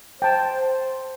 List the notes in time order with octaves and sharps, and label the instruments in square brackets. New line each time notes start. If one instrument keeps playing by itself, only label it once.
[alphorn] C5 [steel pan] G5 A5